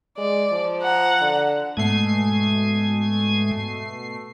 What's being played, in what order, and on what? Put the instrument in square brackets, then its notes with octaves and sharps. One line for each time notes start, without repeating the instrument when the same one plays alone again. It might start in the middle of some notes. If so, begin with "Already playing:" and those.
[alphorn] G#3 [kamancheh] D5
[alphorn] F3
[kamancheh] F#5 A#5
[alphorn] D3
[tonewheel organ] G#2 G#3 G#5 [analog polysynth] B2 A3 C7